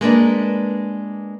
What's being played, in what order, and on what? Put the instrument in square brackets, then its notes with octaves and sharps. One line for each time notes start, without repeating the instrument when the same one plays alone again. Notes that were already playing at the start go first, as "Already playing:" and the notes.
[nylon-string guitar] G#3 A#3 D4 B4